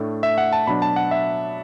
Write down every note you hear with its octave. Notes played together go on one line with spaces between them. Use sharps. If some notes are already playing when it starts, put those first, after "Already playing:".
Already playing: A2 A3 D4
E5
F#5
A5
B2 F#3 D4 B5
A5
F#5
E5